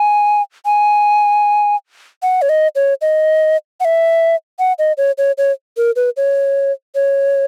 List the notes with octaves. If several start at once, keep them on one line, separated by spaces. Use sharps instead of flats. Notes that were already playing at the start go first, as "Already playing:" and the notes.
Already playing: G#5
G#5
F#5
C#5
D#5
C#5
D#5
F#5
E5
F#5
D#5
C#5
C#5
C#5
A#4
B4
C#5
C#5